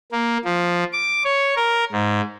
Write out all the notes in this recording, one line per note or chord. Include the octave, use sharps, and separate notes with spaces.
A#3
F3
D6
C#5
A#4
G#2